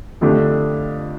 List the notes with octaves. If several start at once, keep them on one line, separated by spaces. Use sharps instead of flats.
F2 D3 A3 D4 G4